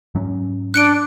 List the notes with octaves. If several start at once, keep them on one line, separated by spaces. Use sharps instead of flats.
G#2 F#3 C#4
D4 F#6 C#7 D7